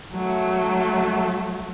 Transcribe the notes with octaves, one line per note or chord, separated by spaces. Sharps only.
F#3 A3